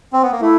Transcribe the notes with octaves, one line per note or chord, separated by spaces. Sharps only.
C4
B3
A#3
A3 E4